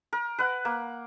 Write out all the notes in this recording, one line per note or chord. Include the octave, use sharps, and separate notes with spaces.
A#4
B4 F#5
A#3